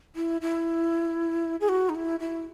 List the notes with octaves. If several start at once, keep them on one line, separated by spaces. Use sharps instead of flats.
E4
E4
G#4
F#4
D#4
E4
E4